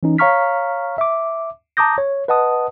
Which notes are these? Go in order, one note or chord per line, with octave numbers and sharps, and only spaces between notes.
E3 C#4 D#4
C#5 F5 A#5 C#6 F6 B6
E5 D6
A5 A#5 D6 D#6 G6 A#6
C#5
B4 D#5 F#5 A5 D#6